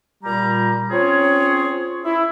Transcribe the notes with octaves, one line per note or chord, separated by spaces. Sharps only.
A#2 G3 A#5
C4 C#4 F4 G#4 C#5
E4